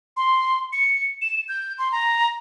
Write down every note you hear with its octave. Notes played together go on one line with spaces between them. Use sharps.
C6
C#7
E7
G6
C6
A#5